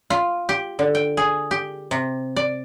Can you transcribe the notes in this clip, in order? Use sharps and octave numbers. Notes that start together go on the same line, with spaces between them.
F4
G4
D3
G5
G#4
G4
C3
D5